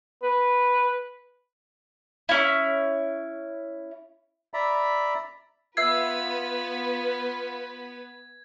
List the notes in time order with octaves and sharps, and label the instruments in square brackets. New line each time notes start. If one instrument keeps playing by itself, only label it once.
[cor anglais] B4
[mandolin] C#4 E4
[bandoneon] D5 E5 A#5 B5
[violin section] B3 B4 [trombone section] F4 [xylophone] E5 E6 C7 [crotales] G#6